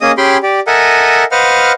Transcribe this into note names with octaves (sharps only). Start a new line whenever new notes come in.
A#3 C#4 G#4 D#5 D#6
C#4 G4 G#4 G5 B5 C6
G4 D5
A4 A#4 D#5 E5 F#5 G#5
B4 C5 D#5 F5 F#5 F6